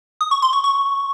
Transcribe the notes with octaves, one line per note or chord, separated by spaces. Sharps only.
D#6
C#6
C6
C#6
C#6